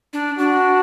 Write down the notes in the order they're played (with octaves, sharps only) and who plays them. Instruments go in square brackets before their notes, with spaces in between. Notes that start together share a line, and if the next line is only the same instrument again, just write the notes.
[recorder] D4
[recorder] D4 [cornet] F#4